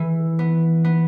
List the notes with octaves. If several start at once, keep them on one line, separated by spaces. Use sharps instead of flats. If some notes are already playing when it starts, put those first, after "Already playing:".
Already playing: E3
B3
B3